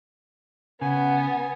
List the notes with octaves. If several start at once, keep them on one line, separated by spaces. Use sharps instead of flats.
C#3 B3 G#5